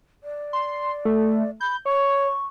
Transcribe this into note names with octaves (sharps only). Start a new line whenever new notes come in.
D5
C6
A3
B5 G6
C#5 C#6